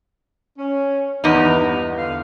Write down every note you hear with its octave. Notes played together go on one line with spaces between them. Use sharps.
C#4
E2 G2 A#3 B3 D#4
D3 F5